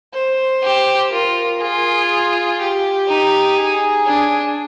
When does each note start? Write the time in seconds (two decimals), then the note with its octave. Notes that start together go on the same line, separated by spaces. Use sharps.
0.13 C5
0.63 G4
1.12 F4 A#4
1.61 F4 G#4
2.59 G4
3.09 D#4
3.58 G#4
4.07 D4